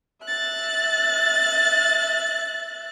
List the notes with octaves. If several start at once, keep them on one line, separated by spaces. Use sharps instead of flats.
E5 F#6 A6